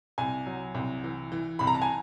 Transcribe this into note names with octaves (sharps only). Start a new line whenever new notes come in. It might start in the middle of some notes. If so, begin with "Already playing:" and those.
C2 G#5
F#3
C2
E3
E3
C2 B5
A#5
A5
G#5